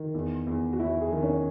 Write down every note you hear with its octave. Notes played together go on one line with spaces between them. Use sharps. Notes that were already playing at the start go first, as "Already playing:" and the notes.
Already playing: D#3
E2
E2
F#4
E2 E4
G#4
D#3
C#4